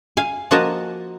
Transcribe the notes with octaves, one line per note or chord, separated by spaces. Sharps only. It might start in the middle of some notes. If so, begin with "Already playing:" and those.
F5 G#5
F3 A#3 F#4 A#4 D#5 A5